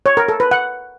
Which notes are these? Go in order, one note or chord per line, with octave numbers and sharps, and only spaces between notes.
C#5
A#4
A4
B4
F#5